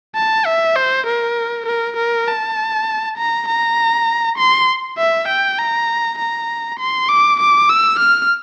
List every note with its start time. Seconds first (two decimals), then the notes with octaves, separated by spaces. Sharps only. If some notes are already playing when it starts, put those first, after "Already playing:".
0.16 A5
0.46 E5
0.76 C5
1.07 A#4
1.66 A#4
1.97 A#4
2.27 A5
3.17 A#5
3.48 A#5
4.38 C6
4.98 E5
5.28 G5
5.59 A#5
6.18 A#5
6.79 C6
7.09 D6
7.40 D6
7.69 E6
8.00 F6